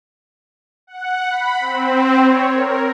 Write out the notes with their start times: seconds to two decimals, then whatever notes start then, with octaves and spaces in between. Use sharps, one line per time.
0.87 F#5
1.29 B5
1.60 C4
2.23 C#5
2.53 A#4